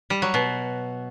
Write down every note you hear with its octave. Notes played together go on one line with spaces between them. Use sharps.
G3
F#3
B2